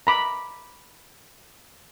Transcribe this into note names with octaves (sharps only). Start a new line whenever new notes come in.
A#5 B5 D6